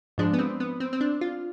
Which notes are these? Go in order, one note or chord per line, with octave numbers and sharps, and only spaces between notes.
G#2 F3 G#3 D4
B3
C4
B3
C4
C4
D4
F4